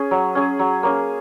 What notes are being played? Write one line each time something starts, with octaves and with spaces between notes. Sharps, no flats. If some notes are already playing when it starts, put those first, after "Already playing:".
Already playing: C#4 G#4
F#3
C#4 G#4
F#3
A#3 C#4 G#4